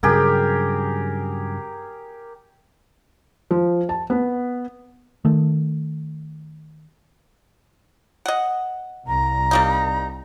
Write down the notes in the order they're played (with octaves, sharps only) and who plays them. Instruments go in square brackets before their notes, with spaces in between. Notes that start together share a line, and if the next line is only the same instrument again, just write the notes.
[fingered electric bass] G2 C#3 F#3 [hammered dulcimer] G4 G#4 A#4
[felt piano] F3
A5
B3
[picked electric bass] D#3 A3
[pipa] D#5 F#5
[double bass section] C2 [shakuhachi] A#5
[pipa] G3 A#3 D#4